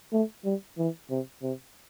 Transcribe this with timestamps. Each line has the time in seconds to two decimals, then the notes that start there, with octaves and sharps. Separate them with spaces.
0.13 A3
0.45 G3
0.79 E3
1.11 C3
1.43 C3